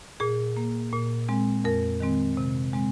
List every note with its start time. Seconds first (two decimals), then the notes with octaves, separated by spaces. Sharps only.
0.20 A#2 G#4
0.57 A#3
0.92 A#2
1.29 G#3 C4
1.64 F2 A#4
2.00 D#3 G#3 C4
2.37 C3
2.73 G#3 C4